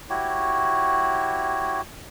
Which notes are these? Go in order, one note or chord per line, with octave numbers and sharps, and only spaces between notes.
E4 F#4 G4 C#5